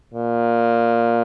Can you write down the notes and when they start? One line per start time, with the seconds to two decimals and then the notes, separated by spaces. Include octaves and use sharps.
0.14 A#2